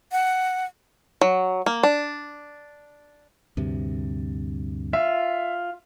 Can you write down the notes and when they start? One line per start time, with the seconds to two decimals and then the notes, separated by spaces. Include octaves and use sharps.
0.12 F#5
1.21 F#3
1.66 A#3
1.83 D4
3.57 D2 G2 C3
4.93 F4 E5